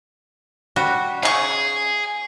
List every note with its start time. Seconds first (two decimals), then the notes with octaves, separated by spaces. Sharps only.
0.76 G3 F#4
1.23 C#3 E4 G#4 C#6